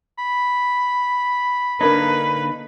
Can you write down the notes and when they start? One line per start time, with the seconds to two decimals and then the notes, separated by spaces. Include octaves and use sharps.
0.18 B5
1.81 D3 A#3 D4 D#4 A#4 B4 C#5